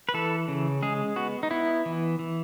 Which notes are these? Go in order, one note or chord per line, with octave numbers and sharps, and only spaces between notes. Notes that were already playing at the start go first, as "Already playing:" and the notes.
B4
E3 A4
C#3
G#3 G#4
B3 F#4
D#4
B3 E4
E3
E3